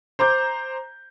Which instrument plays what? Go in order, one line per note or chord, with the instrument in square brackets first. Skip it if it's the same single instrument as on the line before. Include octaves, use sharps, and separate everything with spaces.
[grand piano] C5 A#5 D6 G6